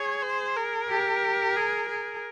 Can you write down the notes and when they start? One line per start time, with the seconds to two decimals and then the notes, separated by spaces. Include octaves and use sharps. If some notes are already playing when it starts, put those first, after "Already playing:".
Already playing: G#4 C#5
0.22 C5
0.56 A#4
0.89 G4
1.56 G#4
1.88 G#4